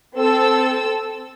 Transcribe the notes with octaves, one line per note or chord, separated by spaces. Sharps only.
C4 A4 E6